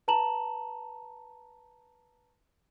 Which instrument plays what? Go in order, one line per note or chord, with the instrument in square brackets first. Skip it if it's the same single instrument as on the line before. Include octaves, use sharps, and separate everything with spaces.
[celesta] B4 A5 A#5 E7 F#7